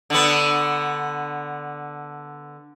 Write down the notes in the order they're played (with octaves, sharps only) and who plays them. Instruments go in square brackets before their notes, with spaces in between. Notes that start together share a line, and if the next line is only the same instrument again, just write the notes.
[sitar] D3 B3